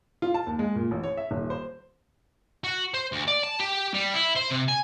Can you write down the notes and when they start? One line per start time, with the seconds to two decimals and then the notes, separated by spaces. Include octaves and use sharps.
0.22 F4
0.34 A5
0.47 D#2
0.59 G#3
0.76 A#2
0.91 A1
1.04 C#5
1.17 E5
1.31 D#1
1.50 C5
2.64 F#4
2.94 C5
3.12 D2
3.28 D5
3.44 A5
3.60 G4
3.94 G3
4.14 E4
4.36 C5
4.51 C3
4.69 G#5